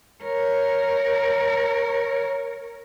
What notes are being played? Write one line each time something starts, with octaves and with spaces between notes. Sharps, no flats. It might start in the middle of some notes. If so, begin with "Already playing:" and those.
A#4 C#5